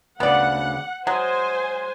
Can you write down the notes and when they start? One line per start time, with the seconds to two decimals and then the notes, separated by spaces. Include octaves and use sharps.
0.20 D2 C#3 B3 D5 F#5
1.07 F#3 G#3 C5 G#5